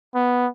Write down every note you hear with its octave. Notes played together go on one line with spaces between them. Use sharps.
B3